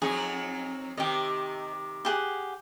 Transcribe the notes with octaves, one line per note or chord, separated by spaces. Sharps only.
F2 F#3 D#4 G#4
C3 D#3 G4 D#5
G4 G#4 F#5